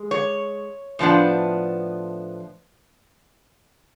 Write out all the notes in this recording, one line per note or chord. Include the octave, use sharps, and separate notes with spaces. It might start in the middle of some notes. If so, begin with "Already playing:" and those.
Already playing: G#3
C#5
A2 F3 B3 D4